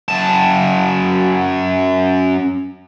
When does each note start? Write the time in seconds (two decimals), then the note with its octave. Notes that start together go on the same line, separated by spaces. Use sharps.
0.08 F#2 A5